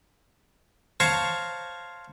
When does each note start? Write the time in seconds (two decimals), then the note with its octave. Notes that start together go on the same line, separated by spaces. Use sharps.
1.00 C5 C#5 F5 A5 A#5 C#6